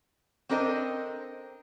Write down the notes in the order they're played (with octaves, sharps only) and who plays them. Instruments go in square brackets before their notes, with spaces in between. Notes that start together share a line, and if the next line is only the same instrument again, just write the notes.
[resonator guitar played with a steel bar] C4 D4 A4 A#4 C5 D#5